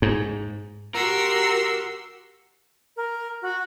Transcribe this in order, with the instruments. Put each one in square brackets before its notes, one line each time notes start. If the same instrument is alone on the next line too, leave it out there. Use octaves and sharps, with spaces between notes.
[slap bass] G#2
[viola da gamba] F#4 G4 [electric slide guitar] A#4 [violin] C6 E6
[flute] A#4
F#4